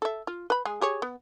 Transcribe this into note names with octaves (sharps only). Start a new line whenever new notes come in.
A4 E5
F4
B4 B5
G#3 G#4
G4 G#4 C#5
B3